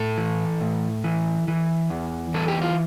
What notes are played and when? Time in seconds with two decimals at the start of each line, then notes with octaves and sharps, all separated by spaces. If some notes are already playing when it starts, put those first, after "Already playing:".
Already playing: A2 A4
0.17 E3
0.61 A2
1.04 E3
1.48 E3
1.90 E2
2.34 E3 A4
2.48 G4
2.62 F4